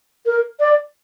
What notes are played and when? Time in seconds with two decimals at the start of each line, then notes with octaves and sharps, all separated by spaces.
0.26 A#4
0.60 D5